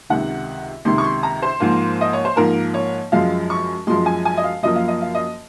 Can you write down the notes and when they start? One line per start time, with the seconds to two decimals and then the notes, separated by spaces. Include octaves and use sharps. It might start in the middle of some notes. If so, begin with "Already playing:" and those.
0.10 C#2 C3 D#3 F#5
0.85 C#2 C3 D#3 C6
0.98 C#6
1.04 C6
1.23 A#5
1.42 C5
1.60 G#2 F3 A#3
2.01 D#5
2.13 C#5
2.25 C5
2.36 G#2 F3 A#3 A#4
2.74 C#5
3.12 F#2 F3 G#3 F5
3.50 C#6
3.87 F#2 F3 G#3 C6
4.06 G#5
4.25 G#5
4.37 D#5
4.44 F5
4.63 F#2 F3 A#3 D#5
4.76 F5
4.88 D#5
5.02 F5
5.15 D#5